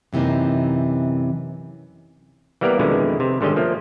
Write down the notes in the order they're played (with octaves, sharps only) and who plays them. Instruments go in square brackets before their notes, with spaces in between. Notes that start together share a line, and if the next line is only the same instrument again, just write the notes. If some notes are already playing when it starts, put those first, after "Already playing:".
[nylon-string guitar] F#2 C3 E3 A#3 D#4
[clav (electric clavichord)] E3 G3 A#3 B3 A#4 D5
F2 B2 D3 D#3 G#3 E4
C3
G#1 D3 G3 C#4 D#5
F3 A3 A#3